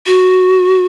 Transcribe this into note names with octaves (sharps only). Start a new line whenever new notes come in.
F#4